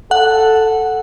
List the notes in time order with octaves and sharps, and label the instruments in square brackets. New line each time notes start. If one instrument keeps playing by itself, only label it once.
[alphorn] A4 [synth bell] F#5